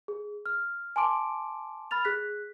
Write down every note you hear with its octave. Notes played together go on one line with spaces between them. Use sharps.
G#4
F6
G#5 A5 C6 D6 D7
B5 F6 A6 F7
G#4 F#6 B6